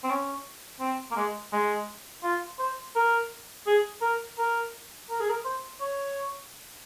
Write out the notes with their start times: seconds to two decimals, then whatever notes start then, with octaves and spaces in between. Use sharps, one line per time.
0.04 C4
0.10 C#4
0.80 C4
1.11 A#3
1.16 G#3
1.53 G#3
2.23 F4
2.59 C5
2.96 A#4
3.67 G#4
4.02 A#4
4.38 A#4
5.10 A#4
5.20 G#4
5.29 A#4
5.45 C5
5.81 C#5